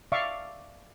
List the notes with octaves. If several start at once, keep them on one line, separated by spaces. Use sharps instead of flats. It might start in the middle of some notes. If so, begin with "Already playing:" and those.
D5 E5 F5 C#6 D6